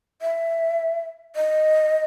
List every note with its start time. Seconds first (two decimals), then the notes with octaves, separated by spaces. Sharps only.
0.22 E5
1.36 D#5